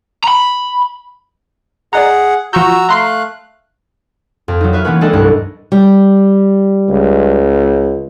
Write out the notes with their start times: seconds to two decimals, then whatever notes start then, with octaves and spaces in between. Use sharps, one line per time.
0.24 A#5 B5
1.93 G#4 D5 D#5 F#5 A#5
2.53 F3 F#4 A#5 C#6 E6 G6
2.89 A3 F5 A#5 C6 F#6 C7
4.48 F2
4.61 F#3 D#4
4.73 B4 E5 F6
4.84 E3 A#3 B3 C#4 B4
5.01 G#3 C4 D4 D#4 A4 D#5
5.13 C2 G2 F#6
5.72 G3
6.89 C#2